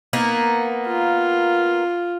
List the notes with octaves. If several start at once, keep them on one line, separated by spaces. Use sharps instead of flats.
A#3 B3 D#4
F4